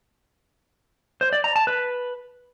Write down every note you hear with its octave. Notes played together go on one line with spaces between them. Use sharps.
C5
D5
A#5
A5
B4